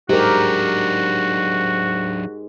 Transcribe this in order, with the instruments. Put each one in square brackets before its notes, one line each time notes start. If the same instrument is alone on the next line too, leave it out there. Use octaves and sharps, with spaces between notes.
[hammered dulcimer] G#2 [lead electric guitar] F#3 D4 [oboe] F#4 [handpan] G4 A#4